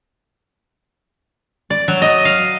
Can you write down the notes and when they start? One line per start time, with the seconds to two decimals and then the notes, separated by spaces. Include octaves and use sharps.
1.70 D5
1.88 F#3
2.02 D#5
2.25 F5